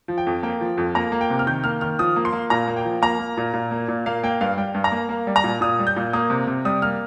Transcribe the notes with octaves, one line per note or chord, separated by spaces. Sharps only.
F3
G5
F2
A#3 G5
F3
F2
A#3 A#5
A#3
G5
C3
F6
D#3 G6
A#3 F6
D#3 F6
F3 D#6
A#3
C6
A#3
A#2 A#5
A#3
G5
F3
A#3 A#5
A#3
A#2
A#2
A#3
A#2
A#3 F5
A#3 G5
G2 F5
G3 G5
G2
A#5
A#3
A#3
G3
A#5
A#2
A#2 D#6
G3
G6
A#2
A#3 D#6
C3
C3
G3 D#6
A#3 F6